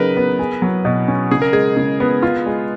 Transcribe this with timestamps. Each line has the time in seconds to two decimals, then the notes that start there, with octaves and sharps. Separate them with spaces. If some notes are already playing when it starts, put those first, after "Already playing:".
Already playing: C#3 F#3 D#4 A#4 B4
0.17 B3
0.39 G#4
0.62 F#3
0.85 B2
1.08 C#4
1.31 C#3 G#4
1.42 A#4
1.53 G#3 G#4
1.76 C#3
2.00 B3
2.22 F4
2.46 G#3